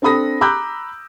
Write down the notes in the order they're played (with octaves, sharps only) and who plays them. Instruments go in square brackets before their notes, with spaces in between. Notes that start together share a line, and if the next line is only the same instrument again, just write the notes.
[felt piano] C4 D4 A4 B5 D#6 A#6
A#5 B5 D6 E6 F#6 G6